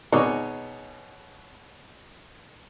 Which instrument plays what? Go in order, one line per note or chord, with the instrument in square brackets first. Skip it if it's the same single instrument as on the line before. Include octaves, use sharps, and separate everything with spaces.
[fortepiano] B2 D#4 G#4 C#5 D5 D#6